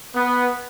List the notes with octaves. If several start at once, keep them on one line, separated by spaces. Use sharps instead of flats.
B3